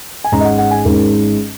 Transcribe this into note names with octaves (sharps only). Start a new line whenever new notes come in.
G#5
G#1 G#2 G#3 C#4 A#5
D#5
F#5
F#5
G#5
G#1 G#2 G#3 C#4 A#4